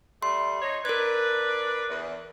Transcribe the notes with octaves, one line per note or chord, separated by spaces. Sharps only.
G3 A3 C6
D#4 C#5
D4 A#4 B4 G#6
E2